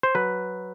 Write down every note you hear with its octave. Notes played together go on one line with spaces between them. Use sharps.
C5
F#3 B4